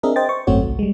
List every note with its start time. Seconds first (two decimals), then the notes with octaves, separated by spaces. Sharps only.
0.03 C4 D4 G#4 A#4 D#5 E5
0.16 C5 D#5 G5 A6
0.29 C5 C#6
0.47 G#1 F#2 A3 C4 F#4 C#5
0.65 C2
0.79 G3 G#3